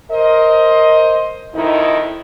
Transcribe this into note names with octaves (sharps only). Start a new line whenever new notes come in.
A#4 C5 D#5
F2 D#3 D#4 E4